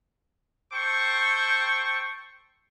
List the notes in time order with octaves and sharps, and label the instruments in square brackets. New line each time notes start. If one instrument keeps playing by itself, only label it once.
[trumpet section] A4 C5 G5 C#6